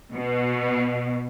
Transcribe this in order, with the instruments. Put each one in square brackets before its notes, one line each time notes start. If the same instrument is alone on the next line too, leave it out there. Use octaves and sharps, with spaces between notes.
[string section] B2